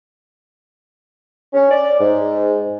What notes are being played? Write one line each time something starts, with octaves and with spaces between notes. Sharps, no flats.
C#4
D5
G#2